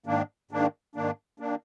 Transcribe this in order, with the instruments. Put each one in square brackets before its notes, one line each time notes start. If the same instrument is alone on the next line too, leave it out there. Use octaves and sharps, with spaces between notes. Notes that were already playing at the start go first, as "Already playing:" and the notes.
[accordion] G#2 D#3 A#3 D4
G#2 D#3 A#3 D4
G#2 D#3 A#3 D4
D#3 A#3 D4